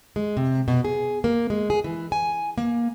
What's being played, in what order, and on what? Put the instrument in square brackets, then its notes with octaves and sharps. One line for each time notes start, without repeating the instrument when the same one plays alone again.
[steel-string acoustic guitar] G#3
C3
B2
G#4
A#3
G#3
G#4
E3
G#5
A#3